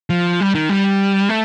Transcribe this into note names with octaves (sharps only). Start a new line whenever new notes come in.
F3
G3
D#3
G3
A3